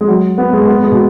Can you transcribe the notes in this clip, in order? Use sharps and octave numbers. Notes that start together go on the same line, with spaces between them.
G#3
F#3
B3
G#3
B3
G#3
B2